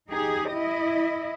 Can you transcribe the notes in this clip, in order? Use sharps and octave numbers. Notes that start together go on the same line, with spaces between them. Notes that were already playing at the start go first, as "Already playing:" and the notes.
D#4 G4 G#4
E4 D#5